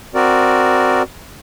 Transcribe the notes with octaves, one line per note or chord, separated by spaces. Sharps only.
C4 F#4 A#4 D5